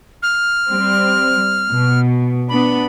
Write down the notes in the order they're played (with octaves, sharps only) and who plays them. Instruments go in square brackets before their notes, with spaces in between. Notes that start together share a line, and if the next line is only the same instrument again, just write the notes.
[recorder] F6
[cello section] G3 C4
B2
[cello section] B3 D4 [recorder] B5